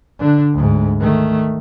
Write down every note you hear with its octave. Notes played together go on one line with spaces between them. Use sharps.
D3 D4
D2 G#2
D#3 A3